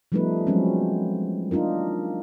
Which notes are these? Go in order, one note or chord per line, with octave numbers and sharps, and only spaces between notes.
F3 G3 A3 B3 D#4 B4
F3 F#3 G#3 C4 C#4
A#3 D4 D#4 F4 A#4